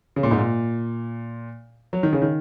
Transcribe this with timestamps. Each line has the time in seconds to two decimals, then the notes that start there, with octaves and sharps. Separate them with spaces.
0.16 C#3
0.23 A#2
0.31 G#2
0.38 A#2
1.93 F#3
2.03 D#3
2.13 C#3
2.22 D#3